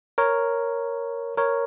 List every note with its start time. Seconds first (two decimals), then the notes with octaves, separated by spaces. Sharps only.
0.18 A#4 C#5
1.37 A#4 C#5